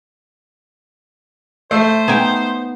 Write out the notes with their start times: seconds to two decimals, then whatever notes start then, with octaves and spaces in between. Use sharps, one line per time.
1.71 A3 C5
2.08 B3 D#4 G5 G#5